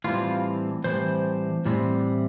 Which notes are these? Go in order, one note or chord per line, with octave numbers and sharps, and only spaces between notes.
A2 E3 G3 C4 F4
A2 E3 G3 C4 C5
A2 E3 G3 C4